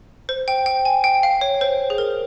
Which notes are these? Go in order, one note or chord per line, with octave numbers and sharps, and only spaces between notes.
C5
G5
G5
G#5
G5
F5
C#5
C5
G#4
A#4